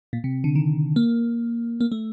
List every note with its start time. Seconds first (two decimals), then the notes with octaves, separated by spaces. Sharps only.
0.13 A#2
0.24 C3
0.44 D3
0.55 D#3
0.96 A#3
1.81 A#3
1.92 A3